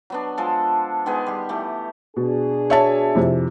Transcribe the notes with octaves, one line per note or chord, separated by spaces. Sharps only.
F#3 B3 D4
F3 G#3 A4
D#3 G#3 B3 G#4
G3 G4
E3 A3 G4
B2 D4 G#4
C#5 E5 A5
F2 C3 E4